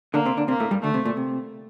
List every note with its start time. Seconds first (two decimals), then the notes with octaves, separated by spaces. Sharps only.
0.14 D3 A#3 D4
0.25 C3 C4
0.37 D3 D4
0.48 C3 A#3 C4
0.60 A2 A3
0.71 G2 G3
0.83 D2 D3 A3
0.94 C3
1.05 A#2
1.17 C3